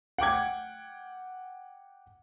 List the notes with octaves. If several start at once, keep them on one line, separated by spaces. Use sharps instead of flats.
F#5 G5 D6 G#6